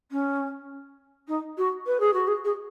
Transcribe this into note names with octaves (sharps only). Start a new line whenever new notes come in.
C#4
D#4
F#4
B4
G#4
F#4
G#4
G#4